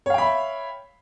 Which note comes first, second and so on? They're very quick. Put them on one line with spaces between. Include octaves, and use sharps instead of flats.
C#5 F5 G5 B5 E5